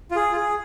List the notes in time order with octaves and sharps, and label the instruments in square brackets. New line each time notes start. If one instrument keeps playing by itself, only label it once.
[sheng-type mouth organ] F4
G#4
F4
G#4